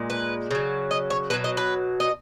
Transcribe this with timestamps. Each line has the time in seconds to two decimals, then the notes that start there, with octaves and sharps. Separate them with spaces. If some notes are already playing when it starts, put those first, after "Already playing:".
Already playing: A#2 G#3
0.10 B4
0.51 C#3 F#3
0.91 D#5
1.10 C#5
1.30 B2 F#3 B4
1.44 D#5
1.57 B4
2.00 D#5